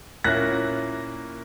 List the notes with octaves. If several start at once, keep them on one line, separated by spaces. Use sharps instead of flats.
A#2 A#3 C#4 E4 F#6 A#6